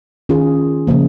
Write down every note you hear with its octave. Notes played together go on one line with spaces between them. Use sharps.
D#3 C#4 F4 G#4
C#3 F3 A#3